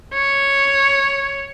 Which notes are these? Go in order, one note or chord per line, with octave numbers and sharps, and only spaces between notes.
C#5